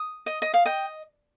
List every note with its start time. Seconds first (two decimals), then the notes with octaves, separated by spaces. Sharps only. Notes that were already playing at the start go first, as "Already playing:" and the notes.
Already playing: D#6
0.26 D#5
0.42 D#5
0.54 F5
0.65 D#5 G5